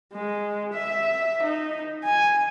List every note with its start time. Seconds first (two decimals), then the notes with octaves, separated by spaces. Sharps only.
0.13 G#3
0.73 E5
1.43 D#4
2.04 G#5